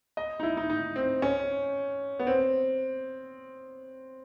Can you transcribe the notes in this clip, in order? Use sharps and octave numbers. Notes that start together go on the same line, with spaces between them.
D#5
D#4
E4
D#4
D#4
C4
C#4
B3
C4